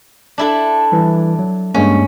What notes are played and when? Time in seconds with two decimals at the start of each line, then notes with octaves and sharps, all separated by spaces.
0.38 D4 E4 A4
0.92 E3 G3
1.39 F#3
1.74 G2 G#3 A#3 C#4